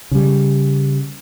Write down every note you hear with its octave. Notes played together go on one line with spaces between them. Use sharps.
C#3 G3